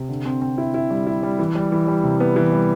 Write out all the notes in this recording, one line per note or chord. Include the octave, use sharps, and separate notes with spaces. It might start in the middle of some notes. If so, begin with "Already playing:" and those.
Already playing: C3
D3
C4
C4
E4
E4
G3
E4
G3
E3
G3
E3
G3
C3
B3
E3
G3